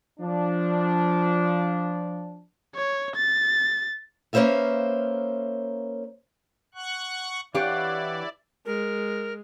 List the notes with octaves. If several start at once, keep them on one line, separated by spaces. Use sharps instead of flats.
F3 D4
C#5
A6
A#3 C#4 B4 C5 E5 F5
F#5 C#6 F#6
E3 D4 E4 G4 C#5 D5 F5 F#5
G#3 A#4